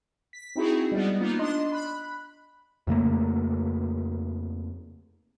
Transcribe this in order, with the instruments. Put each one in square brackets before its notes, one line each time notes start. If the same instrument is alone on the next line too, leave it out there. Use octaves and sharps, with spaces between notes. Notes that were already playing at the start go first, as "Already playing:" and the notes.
[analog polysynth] B6
C4 D#4 E4 F#4 G#4
G3 G#3 B3
A#3 B3 D#4 F4
D4 D#5 C6
B5 F#6
[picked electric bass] F2 C#3 A3 A#3